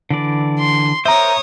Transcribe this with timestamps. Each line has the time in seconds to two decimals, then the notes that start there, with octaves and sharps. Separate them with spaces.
0.10 D3 E3 D5
0.59 C6
1.05 A#4 C5 C#5 E5 A#5 D#6